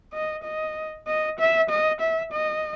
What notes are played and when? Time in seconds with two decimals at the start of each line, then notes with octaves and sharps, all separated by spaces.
0.14 D#5
0.44 D#5
1.07 D#5
1.39 E5
1.70 D#5
2.01 E5
2.32 D#5